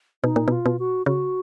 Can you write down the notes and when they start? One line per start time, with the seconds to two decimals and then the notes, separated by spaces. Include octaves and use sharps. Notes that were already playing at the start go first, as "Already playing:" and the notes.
0.24 B2 D#4
0.36 A#2
0.48 B2 F4
0.66 B2
0.79 F#4
1.06 C#3 F#4